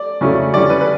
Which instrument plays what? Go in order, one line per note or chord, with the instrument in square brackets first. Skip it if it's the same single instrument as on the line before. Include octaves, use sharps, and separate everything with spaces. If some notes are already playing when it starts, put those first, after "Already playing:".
Already playing: [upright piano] D5
[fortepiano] C#3 F#3 A3 C#4 E4
[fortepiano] D3 G3 C#4 E4 [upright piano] D5
[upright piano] B4
B4